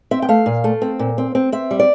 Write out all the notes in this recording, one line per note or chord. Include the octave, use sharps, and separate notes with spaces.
C4 E5
G5
A3 F5
A#2
A3
C4
A#2
C4
C4
C4 E5
G3
D5